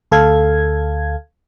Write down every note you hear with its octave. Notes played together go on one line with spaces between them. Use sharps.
D2 A4 F5 G#6